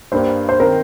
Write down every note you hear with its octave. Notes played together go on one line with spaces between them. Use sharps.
G2 G3 A#3 C5
C5
D#3 C4 A#4